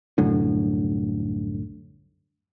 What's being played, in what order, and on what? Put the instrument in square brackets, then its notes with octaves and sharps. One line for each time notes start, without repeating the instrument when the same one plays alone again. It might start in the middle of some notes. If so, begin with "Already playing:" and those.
[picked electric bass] C2 F#2 A2 D3